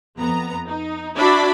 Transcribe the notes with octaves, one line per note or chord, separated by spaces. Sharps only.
F2 B3 A#5
D#4
D4 E4 F#4 D5 B5